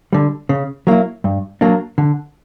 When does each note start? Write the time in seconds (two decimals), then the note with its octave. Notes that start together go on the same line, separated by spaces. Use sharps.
0.13 D3 G3
0.49 C#3
0.87 F#3 A#3 E4
1.24 G2
1.61 F#3 A#3 D4
1.98 D3